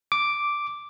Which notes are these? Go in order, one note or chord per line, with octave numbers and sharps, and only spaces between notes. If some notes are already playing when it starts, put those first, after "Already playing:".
D6